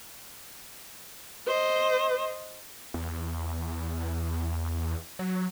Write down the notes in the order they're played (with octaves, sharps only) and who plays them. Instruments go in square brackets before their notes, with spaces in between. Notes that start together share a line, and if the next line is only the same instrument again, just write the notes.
[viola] C5 D#5
[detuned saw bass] E2
F#3